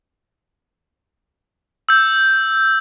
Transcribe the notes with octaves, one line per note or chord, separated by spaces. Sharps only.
E6 G6